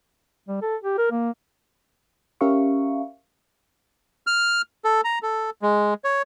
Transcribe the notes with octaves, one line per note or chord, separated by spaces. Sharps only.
G3
A4
G4
A#4
A#3
C#4 G4 A#4 E5 F5 C#6
F6
A4
A#5
A4
G#3
C#5